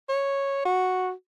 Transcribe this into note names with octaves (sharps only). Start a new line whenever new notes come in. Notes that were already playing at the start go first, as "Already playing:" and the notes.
C#5
F#4